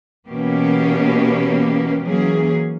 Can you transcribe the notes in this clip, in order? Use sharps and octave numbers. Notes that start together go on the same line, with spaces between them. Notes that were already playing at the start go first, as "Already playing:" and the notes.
B2 E3 A#3 B3 C#4 G4
E3 F#3 A#3 C#4 G#4